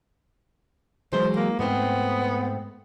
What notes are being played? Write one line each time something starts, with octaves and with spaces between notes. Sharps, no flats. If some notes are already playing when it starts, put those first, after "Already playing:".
E3 F#3 G#3 C5
A#3
G#2 A3 B3 C4